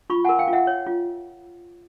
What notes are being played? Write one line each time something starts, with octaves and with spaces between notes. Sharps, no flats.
F4 B5 C#6
A#4 F#5 G#5
F5 G5
F4
E5 F#5
C#5
F4